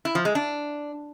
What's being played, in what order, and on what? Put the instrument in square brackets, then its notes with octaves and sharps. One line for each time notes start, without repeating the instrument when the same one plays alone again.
[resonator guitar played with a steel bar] E4
F3
G#3
D4